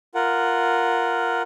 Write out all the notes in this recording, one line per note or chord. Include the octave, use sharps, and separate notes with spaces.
F4 A#4 F#5